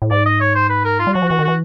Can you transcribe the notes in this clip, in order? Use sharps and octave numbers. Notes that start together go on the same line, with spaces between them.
A2
G#2 D5
D#5
C#5
C5
B4
A#4
F4
G3
F#3 F#4
F3
E3 F#4
D#3
E3 F#4